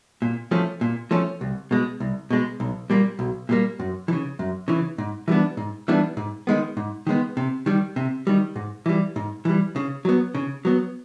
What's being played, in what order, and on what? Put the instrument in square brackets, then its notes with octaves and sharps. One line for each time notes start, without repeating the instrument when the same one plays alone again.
[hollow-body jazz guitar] A#2
F3 A3 C#4
A#2
F3 A3 C#4
C2
B2 G#3
C2
B2 G#3
B1
A#2 G3 A#3
B1
A#2 G3 A#3
F#2
E3
C#3
F#2
C#3 E3
G#2
E3 G3 B3 D4
G#2
E3 G3 B3 D4
G#2
D#3 G#3 B3
G#2
D#3 G#3 B3
C3
D#3 G3
C3
D#3 G3
G#2
E3 G3
G#2
E3 G3
C#3
F#3 B3
C#3
F#3 B3